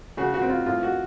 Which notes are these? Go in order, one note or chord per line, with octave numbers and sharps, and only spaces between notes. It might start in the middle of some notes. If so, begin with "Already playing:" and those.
C#3 F#4
F#4
C4
F4
A2 F4
F#4